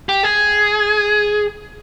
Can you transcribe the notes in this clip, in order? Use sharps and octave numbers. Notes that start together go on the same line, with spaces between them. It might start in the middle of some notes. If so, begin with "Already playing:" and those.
G4
G#4